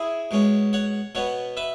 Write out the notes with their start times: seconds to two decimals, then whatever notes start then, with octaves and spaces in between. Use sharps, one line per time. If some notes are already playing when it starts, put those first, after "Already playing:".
Already playing: E4 G#4
0.31 B2 G#3 C#4
0.73 C#5 F#5
1.15 B2 B3 C#5 F#5
1.57 B4 E5